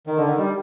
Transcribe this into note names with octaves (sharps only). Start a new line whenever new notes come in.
D#3
D3
D#3
G3